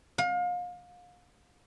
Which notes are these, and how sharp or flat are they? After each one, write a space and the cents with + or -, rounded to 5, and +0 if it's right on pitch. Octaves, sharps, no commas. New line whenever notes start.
F5 +35